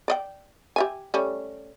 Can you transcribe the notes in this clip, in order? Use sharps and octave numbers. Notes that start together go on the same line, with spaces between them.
D5 D#5 G5
G4 E5 G#5
G3 A3 C#4